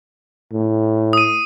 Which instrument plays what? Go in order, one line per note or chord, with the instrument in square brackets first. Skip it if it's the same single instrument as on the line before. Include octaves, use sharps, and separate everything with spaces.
[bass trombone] A2
[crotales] D#6 D#7